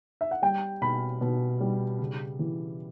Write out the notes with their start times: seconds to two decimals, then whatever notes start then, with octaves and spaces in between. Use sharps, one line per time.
0.21 E5
0.31 F#5
0.42 G3 G5
0.81 B2 B5
1.21 B2
1.61 G3
1.99 C#3
2.39 E3